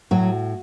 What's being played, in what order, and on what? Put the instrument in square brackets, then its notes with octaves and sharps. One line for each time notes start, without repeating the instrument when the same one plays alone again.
[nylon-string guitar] A2 F#3 F#4